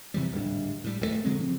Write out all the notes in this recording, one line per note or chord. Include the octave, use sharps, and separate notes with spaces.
C3 E3 F3 G3
D1 G#1 G3 D4
A2 G3
D#1 D#2 C3 A3
D3 F#3 G#3 C4
C#3 F3 C4